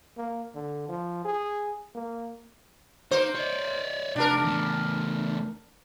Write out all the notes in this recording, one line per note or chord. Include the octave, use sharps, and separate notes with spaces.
A#3
D3
F3
G#4
A#3
A#3 D#4 C5
C#5 D5
C3 A3 D4 A#4
E2 A3